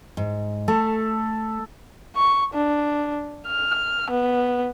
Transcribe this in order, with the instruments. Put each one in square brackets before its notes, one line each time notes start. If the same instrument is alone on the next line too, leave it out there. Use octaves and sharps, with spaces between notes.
[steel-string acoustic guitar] G#2
[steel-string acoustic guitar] A3 [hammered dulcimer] A4
[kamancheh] C#6
D4
F6
B3